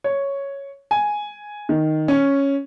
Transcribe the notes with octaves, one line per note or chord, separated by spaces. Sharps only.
C#5
G#5
D#3
C#4